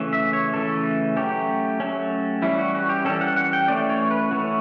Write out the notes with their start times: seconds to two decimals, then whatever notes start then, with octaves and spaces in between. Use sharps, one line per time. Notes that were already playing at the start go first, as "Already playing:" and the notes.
Already playing: C#3 E3 A3 C#4
0.13 E5
0.33 C#5
0.54 C#3 E3 A3 C#4 A4
1.17 F#3 A3 C#4 G4
1.80 F#3 A3 C#4
2.42 E3 G3 C#4 E4
2.58 F#4
2.75 F#4
2.89 G4
3.05 E3 G3 C#4 A4
3.21 F#5
3.36 F#5
3.53 G5
3.68 E3 A3 C#4 D5
3.89 C#5
4.11 B4
4.31 E3 A3 C#4 F#4